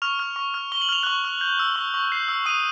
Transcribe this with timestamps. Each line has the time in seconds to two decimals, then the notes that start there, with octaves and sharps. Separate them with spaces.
0.02 C#6 F6 F7
0.20 F6
0.36 C#6
0.54 F6
0.72 C#6 G7
0.82 F#7
0.89 F6 F7
1.03 C#6 F#6 F#7
1.25 F6
1.41 G6
1.59 E6
1.76 C#6
1.94 C#6
2.12 G6 C7
2.28 E6
2.46 C#6 D#6 D#7